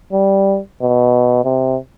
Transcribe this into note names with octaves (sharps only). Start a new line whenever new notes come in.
G3
B2
C3